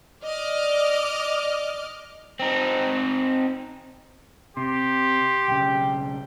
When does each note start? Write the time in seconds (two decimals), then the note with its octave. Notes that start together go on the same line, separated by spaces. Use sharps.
0.25 D5 D#5 D6 F6
2.40 C4 D#4
4.57 C3 G4 C6
5.48 B1 C#3 G5